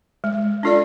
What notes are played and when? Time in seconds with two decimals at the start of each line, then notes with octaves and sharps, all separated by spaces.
0.24 G#3
0.63 D4 F4 A4 D5